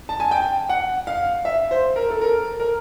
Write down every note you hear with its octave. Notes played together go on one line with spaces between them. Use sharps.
A5
G#5
G5
F#5
F5
E5
C5
A#4
A4
A#4
A#4